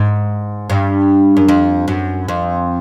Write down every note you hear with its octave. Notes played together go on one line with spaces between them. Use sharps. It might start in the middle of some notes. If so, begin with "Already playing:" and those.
Already playing: G#2
G2
F#2
F2
F#2
F2